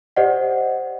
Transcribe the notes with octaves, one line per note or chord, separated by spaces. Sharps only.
G4 C5 D5 D#5 F#5